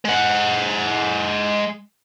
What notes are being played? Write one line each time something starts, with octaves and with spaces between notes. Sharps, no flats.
G#3 F#5